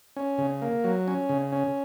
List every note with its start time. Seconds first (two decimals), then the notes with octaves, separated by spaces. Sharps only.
0.17 C#4
0.38 C#3
0.62 A#3
0.84 F#3
1.08 C#4
1.29 C#3
1.52 C#4